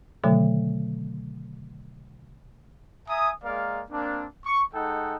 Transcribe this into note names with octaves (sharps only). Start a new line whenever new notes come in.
B2 D3 D#3 F#3 A3
E5 G#5 A#5 D#6
G#3 A#3 A#4 D5 F5
A#3 C4 D4
C#6
G#3 D#4 A4 F#5 G5